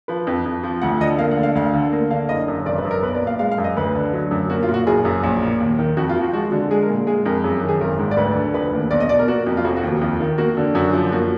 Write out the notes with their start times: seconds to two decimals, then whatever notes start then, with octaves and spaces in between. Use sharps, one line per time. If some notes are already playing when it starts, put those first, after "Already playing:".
0.08 F3 B4
0.27 F2
0.46 F2
0.63 F3
0.82 D2 F#5
1.01 D3 D#5
1.19 A#3 F5
1.31 F#5
1.38 D3
1.43 F5
1.55 D2 F5
1.74 D3
1.92 A#3
2.10 D3 F5
2.29 F#1 D#5
2.48 F#2
2.66 G#1 D5
2.78 B4
2.85 F#2
2.91 A#4
3.03 B1 B4
3.14 D5
3.22 A#2
3.27 F5
3.39 G#3 F5
3.51 F5
3.58 F#2
3.64 D#5
3.76 D2 B4
3.95 D3
4.13 F#3
4.31 F#2
4.50 A#3 F#4
4.63 F4
4.69 A#2
4.74 F#4
4.87 F#1 G#4
5.05 F#2
5.23 A#1
5.42 A#2
5.60 D#2
5.79 D#3
5.97 F2 F#4
6.09 F4
6.16 F3
6.21 F#4
6.33 G#3 F#4
6.52 D3
6.70 G#3 G#4
6.82 A#4
6.89 A#2
7.07 G#3 G#4
7.26 F2 A#4
7.44 F#2 G#4
7.63 D#3
7.69 G#4
7.81 G#1 A#4
7.99 G#2
8.11 D5
8.17 D2 B4
8.36 D3
8.54 F1 B4
8.73 D#2
8.91 B1 D5
9.00 D#5
9.09 B2 D5
9.19 A#4
9.28 A#3 F#4
9.47 F2
9.57 F4
9.65 F1 F#4
9.77 F#4
9.83 D#2
10.01 F2 F4
10.20 D#3
10.38 A#3 F#4
10.57 D3
10.75 F#2 F#4
10.93 F3
11.12 A#3 F#4